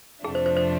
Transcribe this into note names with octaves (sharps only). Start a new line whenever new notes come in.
F2 C3 F3 A3 D4 G#4
C5
C5
C5